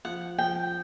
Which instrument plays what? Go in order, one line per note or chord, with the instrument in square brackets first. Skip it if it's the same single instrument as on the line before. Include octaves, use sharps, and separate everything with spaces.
[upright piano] F3 [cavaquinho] F#5
[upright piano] F3 [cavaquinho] G5